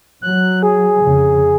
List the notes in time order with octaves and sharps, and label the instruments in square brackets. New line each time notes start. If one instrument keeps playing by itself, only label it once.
[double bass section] F#3 [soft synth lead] F#6
[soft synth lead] G#4
[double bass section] F2 C#3